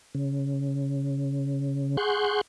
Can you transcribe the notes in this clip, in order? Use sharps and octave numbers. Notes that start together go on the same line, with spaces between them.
C#3
G#4 F#5 C6 C#6 G6